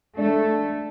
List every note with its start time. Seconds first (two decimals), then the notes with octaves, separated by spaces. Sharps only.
0.17 A3 D4 D5